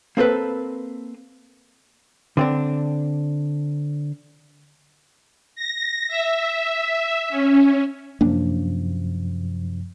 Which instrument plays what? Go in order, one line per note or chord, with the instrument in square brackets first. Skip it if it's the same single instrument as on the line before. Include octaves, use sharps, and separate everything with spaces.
[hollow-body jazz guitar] A#3 C4 A4 B4
D3 C4 D4
[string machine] A#6
E5
C#4
[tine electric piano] F#2 C3 F3 [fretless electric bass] A#3 D4